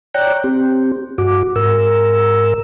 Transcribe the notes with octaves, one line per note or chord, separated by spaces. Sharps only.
C#5 D5 G5 A#5 F#6
C4 G4
G2 F#4 D6
G#2 A#4 E6